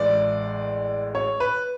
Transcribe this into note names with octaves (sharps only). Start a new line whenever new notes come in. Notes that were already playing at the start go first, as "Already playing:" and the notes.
Already playing: A1 A2 E3 G#3 D5
C#5
B4